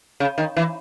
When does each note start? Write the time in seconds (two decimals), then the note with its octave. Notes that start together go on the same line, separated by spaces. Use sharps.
0.20 C#3
0.38 D#3
0.57 E3